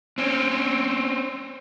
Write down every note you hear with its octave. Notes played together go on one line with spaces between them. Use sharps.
C4 C#4